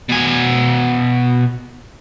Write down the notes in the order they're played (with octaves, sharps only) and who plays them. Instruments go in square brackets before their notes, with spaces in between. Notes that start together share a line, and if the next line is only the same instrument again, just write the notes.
[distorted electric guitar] B2 G#5